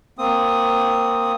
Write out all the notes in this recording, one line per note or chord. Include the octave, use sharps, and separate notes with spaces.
A#3 C4 D#6